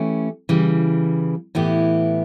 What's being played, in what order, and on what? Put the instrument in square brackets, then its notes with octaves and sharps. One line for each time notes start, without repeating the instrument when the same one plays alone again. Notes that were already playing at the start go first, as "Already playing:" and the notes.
Already playing: [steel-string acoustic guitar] E3 A3 C#4 G4
C#3 E3 G3
A2 E3 B3 E4 G4